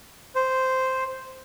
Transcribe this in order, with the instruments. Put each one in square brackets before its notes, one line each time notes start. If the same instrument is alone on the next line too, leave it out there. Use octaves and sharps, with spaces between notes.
[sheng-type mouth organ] C5